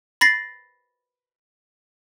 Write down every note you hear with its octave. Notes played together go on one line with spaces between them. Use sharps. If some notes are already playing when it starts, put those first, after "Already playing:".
B5 A6 A#6 C7